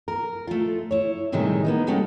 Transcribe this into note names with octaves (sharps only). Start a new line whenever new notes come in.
A#4
A3 F4
E4 C#5
A2 C3 D#3 G3 G#3 E4
A#3 B3 D#4
G3 G#3 C#4 F#4 G4 A4